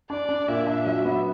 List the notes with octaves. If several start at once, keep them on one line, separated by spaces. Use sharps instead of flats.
D4 D5
D4
A#2 E5
D4
F#3
B3